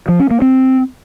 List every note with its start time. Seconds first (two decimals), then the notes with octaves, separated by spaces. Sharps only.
0.08 F3
0.20 C#4
0.31 A#3
0.42 C4